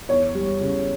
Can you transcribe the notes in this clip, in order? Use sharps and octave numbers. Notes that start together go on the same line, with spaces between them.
E2 C#5
G3
C#3